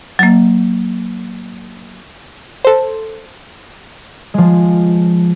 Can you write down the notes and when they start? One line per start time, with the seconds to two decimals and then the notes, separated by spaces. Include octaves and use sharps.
0.19 F#3 A#3
2.65 A4 C5
4.34 F3 G#3